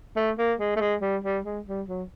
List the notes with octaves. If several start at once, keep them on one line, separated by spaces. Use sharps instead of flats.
A3
A#3
G#3
A3
G#3
G3
G3
G#3
G3
F#3